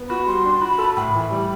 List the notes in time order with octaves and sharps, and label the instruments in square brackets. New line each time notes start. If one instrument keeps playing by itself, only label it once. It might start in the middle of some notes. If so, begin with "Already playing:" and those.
Already playing: [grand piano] B3
[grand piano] F#4 [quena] B5
[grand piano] G3 [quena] C6
[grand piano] D4
[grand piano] F#4 [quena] B5
[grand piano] A4
[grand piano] A2 [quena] B5
[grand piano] E3
G3